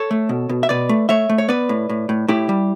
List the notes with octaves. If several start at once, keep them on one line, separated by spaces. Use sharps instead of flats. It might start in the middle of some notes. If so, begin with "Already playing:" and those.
Already playing: A4 C#5
A3
B2
B2
E5
B2 B4 D5
A3
A3 C#5 E5
A3
C#5
B3 B4 D5
A2
A2
A2
A2 E4 G4
G3